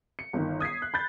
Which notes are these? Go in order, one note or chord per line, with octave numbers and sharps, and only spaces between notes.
C#7
G1 D#3
D#6 G#6 B6 C7
F#6
B5 G6 A6